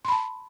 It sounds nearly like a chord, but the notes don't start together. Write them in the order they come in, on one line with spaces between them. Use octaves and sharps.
C6 B5 A5